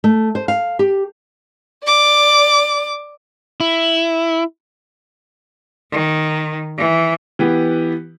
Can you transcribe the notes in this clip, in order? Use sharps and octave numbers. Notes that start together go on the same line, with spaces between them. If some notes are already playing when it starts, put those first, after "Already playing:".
A3
C5
F5
G4
D5 D6
E4
D#3
E3
E3 B3 G4